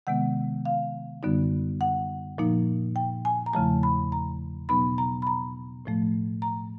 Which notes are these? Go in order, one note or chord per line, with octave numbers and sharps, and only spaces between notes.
C3 D#3 G#3 B3 F#5
F5
F#2 D3 G3 B3 D#4
F#5
A#2 F3 A#3 D#4
G5
G#5
A#5
E2 C#3 F3 A3 A5
B5
A#5
B2 F#3 B3 D#4 B5
A#5
B5
A#5
A2 F3 A3
A#5